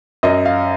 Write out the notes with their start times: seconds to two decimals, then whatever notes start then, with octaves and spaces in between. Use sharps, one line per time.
0.23 F#2 D#5
0.46 F5